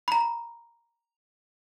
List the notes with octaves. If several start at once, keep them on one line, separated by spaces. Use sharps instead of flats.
A#5 B5